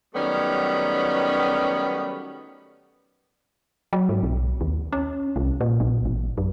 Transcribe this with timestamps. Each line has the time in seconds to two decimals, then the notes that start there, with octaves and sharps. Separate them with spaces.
0.15 D#3 F#3 G3 A3 B3 C#4
3.93 F#3
4.09 G#2
4.23 B1
4.61 D#2
4.93 C#4
5.36 C2
5.61 A#2
5.80 A#1
6.05 A1
6.38 F#2